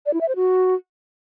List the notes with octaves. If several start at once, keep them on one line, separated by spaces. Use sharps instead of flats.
D5
E4
E5
C5
F#4